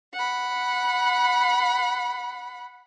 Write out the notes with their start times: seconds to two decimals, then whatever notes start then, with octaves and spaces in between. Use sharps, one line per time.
0.13 F#5 B5